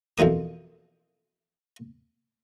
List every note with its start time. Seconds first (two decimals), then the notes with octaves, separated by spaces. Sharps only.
0.18 F2 B2 E3 A#3 D#6